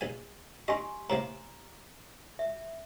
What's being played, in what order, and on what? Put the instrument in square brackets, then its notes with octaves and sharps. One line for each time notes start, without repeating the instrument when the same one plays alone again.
[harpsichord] A#1 G#5
[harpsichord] D#4 D#5 [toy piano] G4 G#5 C6
[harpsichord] A2 C3 A#3 [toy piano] A#5
[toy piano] E5